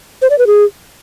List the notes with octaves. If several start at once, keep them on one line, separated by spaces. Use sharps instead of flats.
C5
D5
B4
G#4